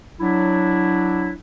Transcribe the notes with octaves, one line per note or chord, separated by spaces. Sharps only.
F#3 D4 E4